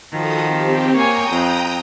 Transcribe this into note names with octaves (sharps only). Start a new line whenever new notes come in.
D#3 F3 F#4 A4 D#6
C4 G4
A#3 C#5 G5 G#5 A#5 D#6
F2